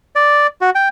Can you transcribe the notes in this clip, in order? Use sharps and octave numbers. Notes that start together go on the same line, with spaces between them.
D5
F#4
G5